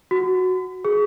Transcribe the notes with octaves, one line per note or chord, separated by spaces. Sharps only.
F#4
G#4